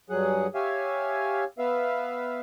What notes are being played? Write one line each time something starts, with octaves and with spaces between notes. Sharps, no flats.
G2 F#3 G#4 F#5
G4 C#5 E5 F5 G#5
B3 B4 E5 F5